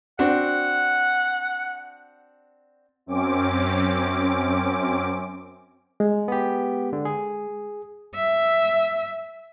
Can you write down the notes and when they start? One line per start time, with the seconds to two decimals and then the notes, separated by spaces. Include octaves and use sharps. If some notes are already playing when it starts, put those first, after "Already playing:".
0.19 C4 D4 F#4 F#5
3.06 F#2 C4 C#4 D6
6.00 G#3
6.28 B3 G4
6.93 D3
7.05 G#4
8.15 E5